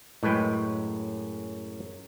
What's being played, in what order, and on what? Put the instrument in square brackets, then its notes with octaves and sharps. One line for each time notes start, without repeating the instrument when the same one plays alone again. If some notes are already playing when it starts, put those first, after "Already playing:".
[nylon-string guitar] F#2 G#3 [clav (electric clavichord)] A2 B4 G5